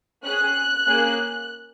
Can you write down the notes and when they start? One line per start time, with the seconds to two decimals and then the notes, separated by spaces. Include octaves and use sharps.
0.24 C#4 G#4 F#6
0.87 A#3 C#4 G#4